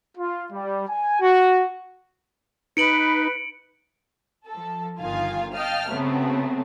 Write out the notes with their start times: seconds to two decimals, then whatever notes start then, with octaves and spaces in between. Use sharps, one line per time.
0.18 F4
0.52 G3
0.88 G#5
1.20 F#4
2.77 D#4 B4 C#7 D7 F#7
4.47 F3 A4
5.00 G1 G2 D#3 F4 F5 G#5
5.54 D#5 F5 G5 A5 F6
5.89 C#3 F#3 A3 B3 C4